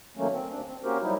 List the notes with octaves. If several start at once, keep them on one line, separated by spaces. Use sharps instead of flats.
D#3 F#3 A3 A#3 C#4
C4
D#2 D4
C4
A#3 C#4 F#4 G4 A#4 C5
F#3 G3 D#4 E4